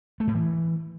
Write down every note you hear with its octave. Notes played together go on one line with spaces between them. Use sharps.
A3
A2
E3